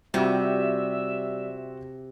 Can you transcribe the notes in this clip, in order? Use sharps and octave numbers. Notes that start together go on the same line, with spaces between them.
C3 G3 C4 F4 F#4 E5